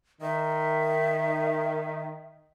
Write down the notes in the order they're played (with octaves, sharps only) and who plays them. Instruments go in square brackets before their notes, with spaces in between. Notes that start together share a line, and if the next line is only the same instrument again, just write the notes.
[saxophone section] D#3 [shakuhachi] E5